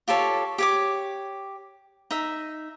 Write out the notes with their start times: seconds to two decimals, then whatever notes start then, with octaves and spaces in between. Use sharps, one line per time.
0.08 F4 G4 A4 C#5
0.58 G4 C#5 D6
2.11 D#4 E5